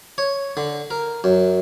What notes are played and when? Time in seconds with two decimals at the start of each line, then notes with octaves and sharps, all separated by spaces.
0.18 C#5
0.57 D3
0.91 A#4
1.24 F#2